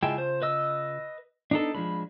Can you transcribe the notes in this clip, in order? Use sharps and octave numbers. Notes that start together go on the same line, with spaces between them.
C#3 G#3 E4 F4 G5 A5
C5
B4 D#5 E6
B3 D4 D#4 A4
F3 G#3 D4 B5